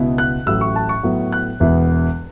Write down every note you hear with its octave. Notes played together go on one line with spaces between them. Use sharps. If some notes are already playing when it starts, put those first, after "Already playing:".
Already playing: C#2 B2 B3 E4
F#6
A1 A2 F#3 E6
C#6
A5
C#6
A2 F#3 B3 E4
F#6
E1 E2 E3 B3 E4